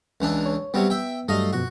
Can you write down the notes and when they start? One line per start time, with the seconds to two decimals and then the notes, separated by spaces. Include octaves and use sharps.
0.21 C#2 E3 D4
0.46 C#5
0.74 C3 F#3 G3 B3
0.90 E5 G5
1.28 G2 F#3 G3 A3 D#5 F5
1.53 F#2 B2 F3 F#4